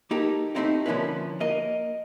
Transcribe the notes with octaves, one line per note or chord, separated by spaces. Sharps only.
A#3 D#4 G4 A4
A3 A#3 C4 D#4 E4 G4
D3 F3 A#3 C#4 E4 B4
A#3 A#4 D#5